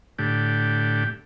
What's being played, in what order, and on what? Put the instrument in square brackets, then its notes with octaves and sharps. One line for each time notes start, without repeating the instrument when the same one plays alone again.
[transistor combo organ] A2 D3 G4